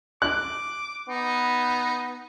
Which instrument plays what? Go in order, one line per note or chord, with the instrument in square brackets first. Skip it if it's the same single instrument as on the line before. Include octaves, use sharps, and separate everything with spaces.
[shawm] D6 [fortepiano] F#6
[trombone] B3 [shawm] D#4